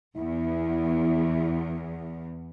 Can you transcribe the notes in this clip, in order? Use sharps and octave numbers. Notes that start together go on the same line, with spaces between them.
E2 E4